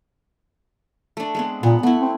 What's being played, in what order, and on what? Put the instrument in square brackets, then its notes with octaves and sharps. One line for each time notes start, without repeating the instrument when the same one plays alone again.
[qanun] A3 D4
G#3 B3 C4
[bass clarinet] A#2 [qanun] B3
[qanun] A3 E4 [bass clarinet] B3
[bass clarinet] C4